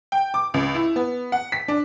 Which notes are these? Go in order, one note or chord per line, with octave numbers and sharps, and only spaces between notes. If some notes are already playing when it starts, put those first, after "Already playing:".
G5
D6
C#2
E4
B3
F#5
B6
D4